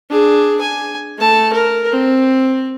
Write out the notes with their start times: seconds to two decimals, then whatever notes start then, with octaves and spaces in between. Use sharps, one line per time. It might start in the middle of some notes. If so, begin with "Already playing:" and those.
0.10 D4 G#4
0.61 G#5
1.18 A3 A5
1.53 A#4
1.91 C4